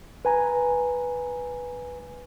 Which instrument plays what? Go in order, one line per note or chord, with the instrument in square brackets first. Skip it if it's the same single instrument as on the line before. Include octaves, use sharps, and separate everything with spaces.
[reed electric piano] B4 G#5 A#5